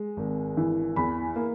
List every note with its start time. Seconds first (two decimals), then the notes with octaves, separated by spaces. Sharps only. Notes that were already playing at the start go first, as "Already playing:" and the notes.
Already playing: G#3
0.17 G#1
0.57 E3
0.96 E2 B5
1.36 A#3